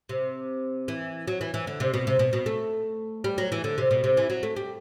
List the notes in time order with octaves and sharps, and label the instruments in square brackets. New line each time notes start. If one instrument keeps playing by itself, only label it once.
[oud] C3
E3
F#3
E3
E3
D3
C3
B2
C3
B2
B2
A3
G3
F#3
E3
D3
C3
B2
C3
E3
F#3
A3
G3